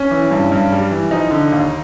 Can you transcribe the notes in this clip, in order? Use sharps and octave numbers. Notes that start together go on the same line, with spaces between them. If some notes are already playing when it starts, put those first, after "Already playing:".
Already playing: C#4
E3
G2
G2
G3
E3
F3 D#4
D3
D#2